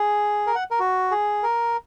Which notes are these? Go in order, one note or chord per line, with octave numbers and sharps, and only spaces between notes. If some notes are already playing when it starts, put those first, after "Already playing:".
Already playing: G#4
A#4
F#5
A#4
F#4
G#4
A#4